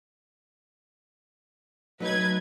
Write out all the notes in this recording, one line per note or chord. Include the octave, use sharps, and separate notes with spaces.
F#3 A3 D#4 B4 G#6